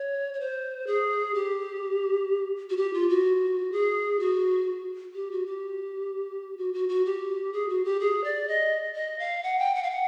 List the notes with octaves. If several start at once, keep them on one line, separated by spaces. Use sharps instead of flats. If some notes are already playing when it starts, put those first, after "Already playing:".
Already playing: C#5
C#5
C5
G#4
G4
F#4
G4
F4
F#4
G#4
F#4
G4
F#4
G4
F#4
F#4
F#4
G4
G#4
F#4
G4
G#4
D5
D#5
D#5
F5
F#5
G5
F#5
F5
F#5